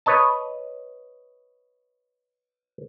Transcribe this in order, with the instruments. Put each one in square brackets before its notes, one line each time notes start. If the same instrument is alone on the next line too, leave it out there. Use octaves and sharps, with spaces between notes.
[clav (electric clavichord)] B4 C#5 D#5 A5